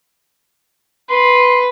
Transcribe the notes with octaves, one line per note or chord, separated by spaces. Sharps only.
B4 C6